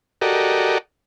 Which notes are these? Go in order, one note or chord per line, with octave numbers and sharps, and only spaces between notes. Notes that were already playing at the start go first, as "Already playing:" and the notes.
F#4 G4 A4 A#4 D5 D#5